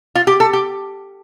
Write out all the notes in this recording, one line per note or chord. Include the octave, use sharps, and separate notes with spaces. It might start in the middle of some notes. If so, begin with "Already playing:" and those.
F4
G4
A4
G4